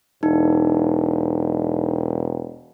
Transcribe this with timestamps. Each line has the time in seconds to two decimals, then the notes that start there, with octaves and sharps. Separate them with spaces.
0.23 E1 D#4